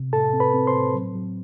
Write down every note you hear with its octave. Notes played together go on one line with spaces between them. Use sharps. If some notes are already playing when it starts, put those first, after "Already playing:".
Already playing: C3
A2 A4 A5
C4
B4 B5
C4
C5 C6
A2
F#3
F#3